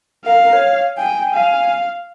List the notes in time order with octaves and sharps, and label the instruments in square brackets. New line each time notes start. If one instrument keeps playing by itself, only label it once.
[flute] A#4 [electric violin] F5
[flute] A#4
C#5
[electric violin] G5 [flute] G#5
[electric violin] F5